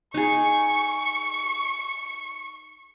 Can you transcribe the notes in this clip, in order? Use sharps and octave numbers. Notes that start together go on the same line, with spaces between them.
D#4 G#4 C#6